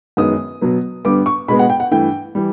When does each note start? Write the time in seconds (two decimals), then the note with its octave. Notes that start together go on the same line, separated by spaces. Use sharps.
0.17 F#2 D#3 G#3 B3 D#6
0.62 B2 F#3 B3
1.05 G2 D3 G3 B3 D6
1.26 C#6
1.48 B2 G#3 B3 B5
1.59 F#5
1.70 G5
1.80 F#5
1.91 G2 E3 A3 G5
2.35 E3 G3